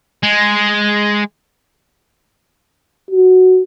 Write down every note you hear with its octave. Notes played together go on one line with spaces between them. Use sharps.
G#3
F#4